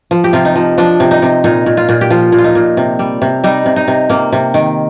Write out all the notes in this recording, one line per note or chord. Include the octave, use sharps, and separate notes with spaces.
F3
G4
C3 F4
D#4
F3
F3 D4
C3
D#4
C3
A#2 D#4
A#2
F4
A#2
G4
F3 F4
A#2
F4
D#4
A#2
C3
G3
C3
G3 D#4
C3
D#4
C3
C3 A#3
C3
D#3